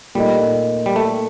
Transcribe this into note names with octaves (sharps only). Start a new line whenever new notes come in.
A#2 G3 A3 D#4
G3
A3